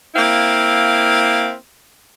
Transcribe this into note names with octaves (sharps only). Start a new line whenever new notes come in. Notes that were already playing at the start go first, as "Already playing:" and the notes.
A#3 C4 E4 F5